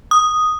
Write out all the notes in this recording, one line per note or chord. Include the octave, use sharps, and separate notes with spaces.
D#6